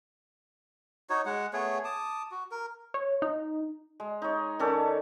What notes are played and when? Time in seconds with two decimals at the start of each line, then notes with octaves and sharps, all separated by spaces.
1.10 D#4 F#4 C#5
1.26 G#3 F#5
1.53 A3 B3 G#4 C#5
1.84 A5 D6 D#6
2.31 F#4
2.51 A#4
2.94 C#5
3.22 D#4
4.00 G#3
4.22 D#4 C#5
4.59 D#3 C#4 A4 D5